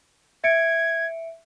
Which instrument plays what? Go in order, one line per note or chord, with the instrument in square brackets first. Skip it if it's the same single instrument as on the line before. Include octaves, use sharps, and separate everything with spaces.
[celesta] E5 C#7 D7 [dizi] G#6